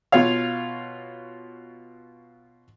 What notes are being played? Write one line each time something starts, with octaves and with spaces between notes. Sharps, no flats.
B2 F4 C#5 F5